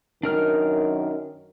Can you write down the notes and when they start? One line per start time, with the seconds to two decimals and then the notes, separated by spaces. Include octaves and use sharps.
0.23 F#2 D#3 D4 A#4 F6